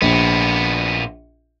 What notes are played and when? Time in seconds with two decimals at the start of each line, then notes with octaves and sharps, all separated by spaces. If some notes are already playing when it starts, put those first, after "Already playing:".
0.02 A#1 A#2 B3